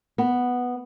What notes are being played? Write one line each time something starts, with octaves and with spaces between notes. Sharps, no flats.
B3